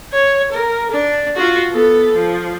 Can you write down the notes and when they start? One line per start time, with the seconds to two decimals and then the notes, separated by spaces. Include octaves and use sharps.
0.13 C#5
0.52 A#4
0.91 D4
1.36 F4 F#4
1.72 B3 A4
2.15 F3